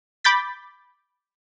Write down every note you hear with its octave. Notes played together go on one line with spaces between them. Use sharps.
B5 D6 G6 A6 B6